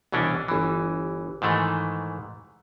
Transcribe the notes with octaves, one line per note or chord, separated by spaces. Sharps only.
C2 B2 E3 C#4 D4
G1 E3
G#2 D#3 E3 A3